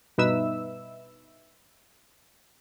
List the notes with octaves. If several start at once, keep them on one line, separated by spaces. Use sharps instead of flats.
G2 B2 D#4 B4 E5 E6